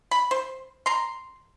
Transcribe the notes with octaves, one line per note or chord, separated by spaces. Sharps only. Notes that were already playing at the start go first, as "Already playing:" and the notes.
B5
C5
A#5 C6